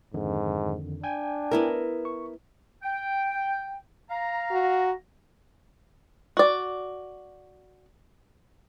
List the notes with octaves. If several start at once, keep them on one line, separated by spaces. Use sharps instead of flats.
F2 G#2 D3 D#3
D4 G5 G#5
B3 E4 A#4
C#6
G5
F5 A#5
F#4
F#4 D5